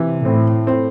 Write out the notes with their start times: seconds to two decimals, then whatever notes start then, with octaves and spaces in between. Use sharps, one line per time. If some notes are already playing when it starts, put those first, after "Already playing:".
Already playing: C3 E3
0.25 A2 C4
0.67 C4